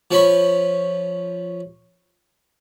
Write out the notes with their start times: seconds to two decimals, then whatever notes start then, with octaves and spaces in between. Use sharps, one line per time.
0.11 F3 C#4 B5 C#6